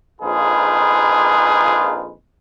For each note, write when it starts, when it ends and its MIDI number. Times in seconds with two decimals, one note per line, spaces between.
0.21 2.12 34
0.21 2.12 41
0.21 2.12 63
0.21 2.12 65
0.21 2.12 68
0.21 2.12 71